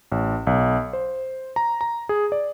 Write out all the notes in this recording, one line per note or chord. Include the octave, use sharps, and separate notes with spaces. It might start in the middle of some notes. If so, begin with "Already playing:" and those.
A1
B1
C5
A#5
A#5
G#4
D5